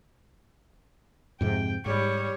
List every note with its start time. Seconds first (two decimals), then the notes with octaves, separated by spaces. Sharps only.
1.41 F2 G#2 C3 G5
1.86 G#2 G3 C#5